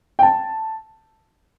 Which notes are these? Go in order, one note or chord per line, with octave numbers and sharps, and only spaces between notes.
G5
A5